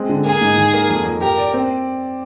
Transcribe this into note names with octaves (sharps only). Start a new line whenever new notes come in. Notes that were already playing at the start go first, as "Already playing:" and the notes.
Already playing: G#3 C4
D3
A#3 G#4
G#2
D#3
A#3
F2
F2
G4 A#4
D5
C4